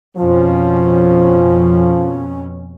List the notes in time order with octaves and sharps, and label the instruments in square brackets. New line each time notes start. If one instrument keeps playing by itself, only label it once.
[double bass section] F2 B2 C#4 [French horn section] F3